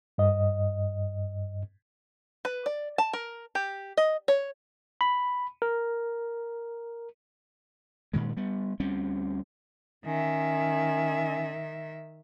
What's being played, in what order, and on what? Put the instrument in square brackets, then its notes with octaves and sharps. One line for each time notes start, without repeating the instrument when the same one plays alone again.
[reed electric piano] G2 D#5
[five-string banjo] B4
D5
A5
A#4
G4
D#5
C#5
[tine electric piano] B5
A#4
[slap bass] G2 A#2 D#3 G#3
G3 B3
D2 G3 C4 C#4
[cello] D#3 E5 [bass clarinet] C#4